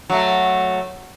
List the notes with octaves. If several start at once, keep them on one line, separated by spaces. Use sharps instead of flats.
F#3 A3